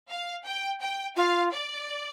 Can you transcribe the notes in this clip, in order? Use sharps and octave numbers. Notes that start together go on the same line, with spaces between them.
F5
G5
G5
F4 F5
D5